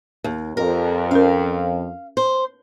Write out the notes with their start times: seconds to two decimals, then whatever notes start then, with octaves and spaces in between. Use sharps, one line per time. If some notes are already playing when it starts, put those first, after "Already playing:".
0.24 D#2
0.57 F2 A#4
1.11 C#4 A#4 F5
2.17 C5